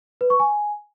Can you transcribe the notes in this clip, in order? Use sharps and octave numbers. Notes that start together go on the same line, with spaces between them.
B4
C#6
G#5